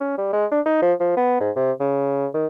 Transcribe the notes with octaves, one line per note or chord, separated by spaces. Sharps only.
C#4
G3
G#3
D4
D#4
F3
F3
B3
G#2
C3
C#3
D#3